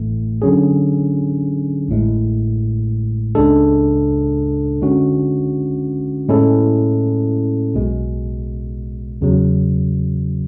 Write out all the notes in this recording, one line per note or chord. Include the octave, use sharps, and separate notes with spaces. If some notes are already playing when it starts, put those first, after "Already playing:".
Already playing: A1 A2 E3 A3
D3 F#3 C#4 G#4
A1 A2 G#3
C#2 C#3 G#3 D4 A4
D3 G#3 C#4 F#4
A2 G#3 C#4 E4 A4
B1 B2 G#3
E2 C#3 F#3